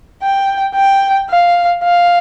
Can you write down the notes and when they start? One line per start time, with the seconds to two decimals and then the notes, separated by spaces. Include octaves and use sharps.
0.23 G5
0.76 G5
1.30 F5
1.84 F5